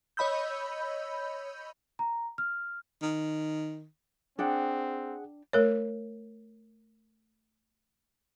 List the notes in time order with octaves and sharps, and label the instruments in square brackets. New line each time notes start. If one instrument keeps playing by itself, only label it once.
[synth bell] C#5 D#5 B5 E6 G6
[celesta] A#5
F6
[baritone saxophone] D#3
[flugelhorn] C4 [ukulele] D4 G5 [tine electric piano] G#4 F#5
[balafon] A3 A#4 C#5